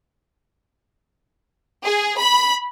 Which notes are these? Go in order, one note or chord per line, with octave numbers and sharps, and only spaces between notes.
G#4
B5